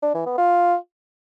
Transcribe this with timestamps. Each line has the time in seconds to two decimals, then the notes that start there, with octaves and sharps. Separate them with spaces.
0.03 D4
0.14 E3
0.26 B3
0.38 F4